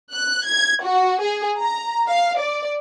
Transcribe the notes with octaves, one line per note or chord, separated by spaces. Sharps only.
F#6
G#6
F#4
G#4
A#5
F5
D5